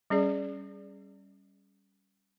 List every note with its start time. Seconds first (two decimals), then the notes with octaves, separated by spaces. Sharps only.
0.10 G3 C#4 G#4 D5